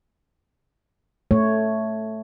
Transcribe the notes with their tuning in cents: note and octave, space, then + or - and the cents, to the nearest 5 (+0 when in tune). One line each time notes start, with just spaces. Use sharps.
A3 +0 C#5 +0